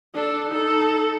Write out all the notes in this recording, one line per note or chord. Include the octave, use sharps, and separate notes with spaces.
D4 A4
D#4 A4